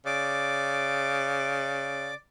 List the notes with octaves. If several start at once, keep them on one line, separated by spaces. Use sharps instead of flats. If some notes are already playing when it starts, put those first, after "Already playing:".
C#3 D5 D6